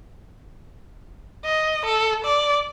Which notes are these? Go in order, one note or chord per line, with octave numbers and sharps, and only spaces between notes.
D#5
A4
D5